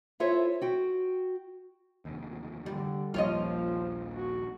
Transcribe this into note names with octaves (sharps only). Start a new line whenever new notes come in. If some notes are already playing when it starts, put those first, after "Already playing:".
E4 F4 A4 C5 C#5 E5
F#4 G5
F1 D#2
D3 G3
A#1 D#2 F3 G3 F4 C#5 D#5
F#4